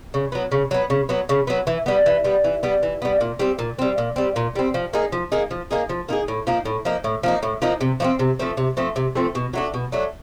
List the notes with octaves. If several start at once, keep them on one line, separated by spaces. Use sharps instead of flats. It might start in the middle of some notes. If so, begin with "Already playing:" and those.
C#3
F#3 B3
C#3
F#3 B3
C#3
F#3 B3
C#3
F#3 B3
E3
G3 B3
E3
G3 B3
E3
G3 B3
E3
G3 B3
A#2
G3 C4
A#2
G3 C4
A#2
G3 C4
A#2
G3 C4
F3
A#3 D#4 G#4
F3
A#3 D#4 G#4
F3
A#3 D#4 G#4
F3
A#3 D#4 G#4
A2
F3 A#3 D#4
A2
F3 A#3 D#4
A2
F3 A#3 D#4
A2
F3 A#3 D#4
C3
F3 A3 C4
C3
F3 A3 C4
C3
F3 A3 C4
C3
F3 A3 C4
B2
F#3 A3 D4
B2
F#3 A3 D4